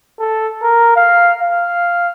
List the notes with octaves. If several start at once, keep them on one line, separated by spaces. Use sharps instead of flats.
A4
A#4
F5
F5